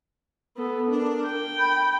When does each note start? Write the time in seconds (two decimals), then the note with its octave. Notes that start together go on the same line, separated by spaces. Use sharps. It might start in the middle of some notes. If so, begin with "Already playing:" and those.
0.57 B3 A4
0.91 D4 A#4
1.26 G5
1.59 B5